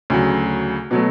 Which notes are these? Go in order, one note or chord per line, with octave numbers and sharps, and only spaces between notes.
D2 C#3 F#3
B2 F#3 A3